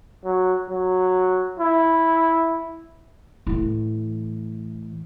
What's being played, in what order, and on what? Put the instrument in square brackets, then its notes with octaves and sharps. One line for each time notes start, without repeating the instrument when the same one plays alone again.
[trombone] F#3
F#3
E4
[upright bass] A2 E3